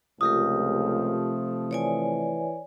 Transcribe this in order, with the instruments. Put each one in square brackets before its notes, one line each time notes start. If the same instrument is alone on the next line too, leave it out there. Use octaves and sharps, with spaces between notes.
[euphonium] C#2 [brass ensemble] C3 F3 A3 [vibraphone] F4 G4 A#4 [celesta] D#6
[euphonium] E3 [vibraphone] C#5 D5 G#5